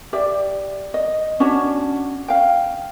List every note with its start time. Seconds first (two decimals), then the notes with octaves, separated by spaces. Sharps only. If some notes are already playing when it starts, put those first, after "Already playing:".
0.13 G4 D5 E5
0.94 D#5
1.40 C#4 D4 F#4 C#5
2.28 F5 G5